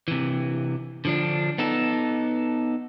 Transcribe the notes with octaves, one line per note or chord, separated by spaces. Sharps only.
C3 E3
D3 F3 D4
B3 D#4 A4